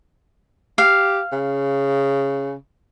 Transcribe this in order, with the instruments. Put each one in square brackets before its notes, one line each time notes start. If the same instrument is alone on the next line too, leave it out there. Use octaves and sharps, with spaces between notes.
[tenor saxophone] G4 [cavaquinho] F5
[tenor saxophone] C#3